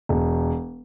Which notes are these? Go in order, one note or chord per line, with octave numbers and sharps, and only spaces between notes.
E1